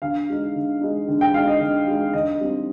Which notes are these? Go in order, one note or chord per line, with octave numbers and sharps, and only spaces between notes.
D3 F5
G#3 D#4
D3
G#3 D#4
D3
G5
G#3 D#4 F5
D#5
D3
G#3 D#4
D3 D#5
G3 C4 D#4